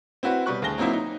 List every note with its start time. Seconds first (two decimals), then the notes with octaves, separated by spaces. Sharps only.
0.23 C4 E4 F#4 B4 C#5
0.46 B2 G3 B4 C#6 F#6
0.62 D2 G#4 A5 A#6 G7
0.78 F#3 A#3 C4 D#4 E4
0.93 D#4